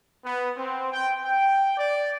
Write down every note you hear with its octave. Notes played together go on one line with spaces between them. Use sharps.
B3
C4
G5
G5
D5